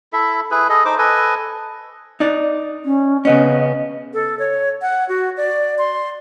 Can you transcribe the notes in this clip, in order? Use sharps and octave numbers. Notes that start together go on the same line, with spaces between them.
E4 A4 E5
E4 G#4 B4
G#4 A4 D#5
D#4 C5 D6
A4 B4 D#5 G#5
D#4 D5
C#4
C#3 B3 C#4 D#5
A4
C#5
F#5
F#4
D5
C6